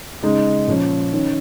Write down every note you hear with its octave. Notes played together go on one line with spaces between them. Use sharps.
C#3 G#3 D#4
A#2 F3 C#4
D#3 C#4